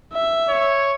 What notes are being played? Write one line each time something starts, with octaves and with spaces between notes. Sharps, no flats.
E5
C#5